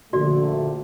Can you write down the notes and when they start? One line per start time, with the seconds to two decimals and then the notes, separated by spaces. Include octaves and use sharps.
0.13 A#1 D3 A3 F#4 D5